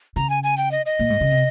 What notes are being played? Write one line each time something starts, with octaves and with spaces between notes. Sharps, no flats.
C#3 A#5
G#5
G#5
G5
D#5
D#5
A#2
G#2
C#3
C3